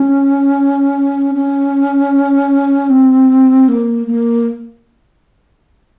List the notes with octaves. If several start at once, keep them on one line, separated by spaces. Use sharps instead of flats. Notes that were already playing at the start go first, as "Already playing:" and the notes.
Already playing: C#4
C#4
C4
A#3
A#3